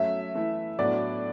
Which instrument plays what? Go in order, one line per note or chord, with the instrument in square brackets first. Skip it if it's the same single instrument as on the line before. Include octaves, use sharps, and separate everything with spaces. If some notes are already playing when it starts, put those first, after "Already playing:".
Already playing: [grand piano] F#3 A3 C#4 [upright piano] E5
[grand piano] E3 A3 E4
[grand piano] A2 F#3 B3 D4 F#4 [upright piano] D5